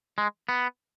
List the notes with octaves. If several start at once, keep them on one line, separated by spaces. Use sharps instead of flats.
G#3
B3